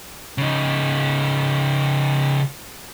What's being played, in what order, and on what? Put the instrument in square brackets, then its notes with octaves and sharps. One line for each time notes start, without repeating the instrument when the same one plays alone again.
[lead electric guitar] C#3 D#4